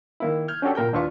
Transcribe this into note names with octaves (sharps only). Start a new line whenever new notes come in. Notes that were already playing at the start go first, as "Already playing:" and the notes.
D#3 A#3 E4
F6 G6 G#6
C#4 D4 F#4 G4 A4
A#2 A#4 G5 G6
D#2 D4 E4 F4 B4 C#6